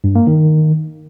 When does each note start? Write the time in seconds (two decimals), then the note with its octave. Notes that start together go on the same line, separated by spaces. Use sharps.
0.04 G2
0.15 A#3
0.27 D#3